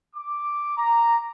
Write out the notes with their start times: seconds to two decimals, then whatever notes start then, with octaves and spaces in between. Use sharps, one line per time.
0.15 D6
0.77 A#5